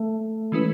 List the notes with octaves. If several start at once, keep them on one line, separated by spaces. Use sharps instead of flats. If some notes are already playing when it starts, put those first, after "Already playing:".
Already playing: A3
E3 G#3 C#4 E4 B4